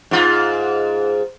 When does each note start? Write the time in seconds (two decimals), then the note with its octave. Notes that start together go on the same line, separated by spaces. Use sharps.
0.11 G#2 F4